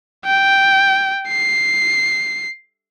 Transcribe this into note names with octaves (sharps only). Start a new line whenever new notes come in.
G5
C7